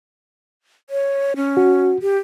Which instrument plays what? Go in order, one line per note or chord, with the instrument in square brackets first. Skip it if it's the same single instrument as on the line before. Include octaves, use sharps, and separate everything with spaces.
[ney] C#5
C#4
[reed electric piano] F#4
[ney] G4